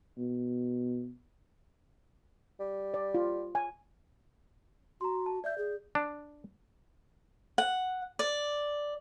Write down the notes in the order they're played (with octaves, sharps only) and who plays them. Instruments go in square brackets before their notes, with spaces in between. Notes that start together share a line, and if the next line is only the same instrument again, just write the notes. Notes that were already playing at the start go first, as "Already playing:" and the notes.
[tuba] B2
[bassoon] G3
[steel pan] D5
F4
G#5
[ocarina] F#4 [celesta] A#5 C6
[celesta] A5
[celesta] D5 G6 [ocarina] E5
[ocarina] G#4
[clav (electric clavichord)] D4
[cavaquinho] F#5
D5